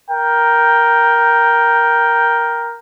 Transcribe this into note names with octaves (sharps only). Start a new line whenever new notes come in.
A#4 G5